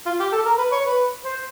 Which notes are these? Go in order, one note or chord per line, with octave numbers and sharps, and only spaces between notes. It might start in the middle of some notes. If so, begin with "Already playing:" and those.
F4
G4
A4
A#4
B4
C#5
B4
C5